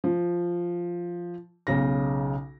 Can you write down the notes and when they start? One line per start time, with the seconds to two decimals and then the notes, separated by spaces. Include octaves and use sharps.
0.04 F3
1.67 B1 C#3 A#6